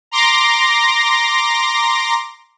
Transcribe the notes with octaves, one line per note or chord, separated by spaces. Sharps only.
A#5 C6 D6 A#6